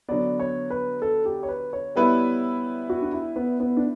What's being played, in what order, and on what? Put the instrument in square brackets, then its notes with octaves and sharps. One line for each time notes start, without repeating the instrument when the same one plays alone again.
[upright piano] D3 F#3 B3 [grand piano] D5
[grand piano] C#5
B4
A4
G4
C#5
B4
C#5
[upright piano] G3 B3 E4 B4
[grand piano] F#4
D4
E4
B3
B3
D4